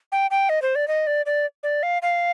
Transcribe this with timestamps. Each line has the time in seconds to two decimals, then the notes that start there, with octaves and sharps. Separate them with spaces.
0.12 G5
0.31 G5
0.49 D#5
0.62 C5
0.75 D5
0.88 D#5
1.07 D5
1.26 D5
1.63 D5
1.83 F5
2.02 F5